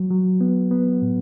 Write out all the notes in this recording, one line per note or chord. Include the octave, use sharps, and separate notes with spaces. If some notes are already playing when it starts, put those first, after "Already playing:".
Already playing: F#3
F#3
B3
B3
A2